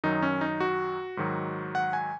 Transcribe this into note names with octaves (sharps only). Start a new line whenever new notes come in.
F#2 D#3 F#3 D#4
C#4
D#4
F#4
G#2 D#3 F#3
F#5
G#5